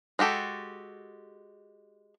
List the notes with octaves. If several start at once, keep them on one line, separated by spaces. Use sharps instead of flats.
G#3 F#4 G4 A4